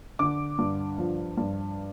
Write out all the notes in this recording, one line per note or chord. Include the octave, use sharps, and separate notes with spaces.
D3 D6
G2
F3
G2